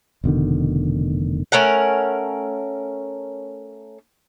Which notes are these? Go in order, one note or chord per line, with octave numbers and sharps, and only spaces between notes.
F1 B2 D3 D#3
A3 C#4 A#4 F#5